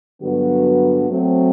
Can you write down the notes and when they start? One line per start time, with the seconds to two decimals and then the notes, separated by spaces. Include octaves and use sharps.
0.21 G2 D3 F#3 B3 F#4
1.08 F#3 A3 C4 F#4